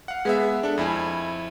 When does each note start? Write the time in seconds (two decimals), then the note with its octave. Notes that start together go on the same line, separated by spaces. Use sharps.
0.08 F5 F#5
0.25 G#3 B3 G#4 B4 E5 F#5
0.63 D4 A4
0.78 F2 E4 G#5